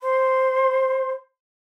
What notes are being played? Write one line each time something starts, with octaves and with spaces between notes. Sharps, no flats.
C5 C6